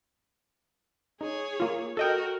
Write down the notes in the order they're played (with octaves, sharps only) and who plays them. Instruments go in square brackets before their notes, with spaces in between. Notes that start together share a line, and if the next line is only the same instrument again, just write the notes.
[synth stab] D#4 [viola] G#4 C#5
[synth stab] A#3 F4
[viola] F#4 A#4 [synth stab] A4 D#5 G5